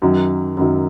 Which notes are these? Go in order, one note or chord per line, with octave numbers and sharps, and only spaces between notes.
F#2 D#3 F#3
F#2 D#3 F#3